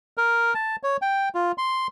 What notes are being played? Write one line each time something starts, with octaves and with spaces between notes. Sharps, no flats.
A#4
A5
C#5
G5
F4
C6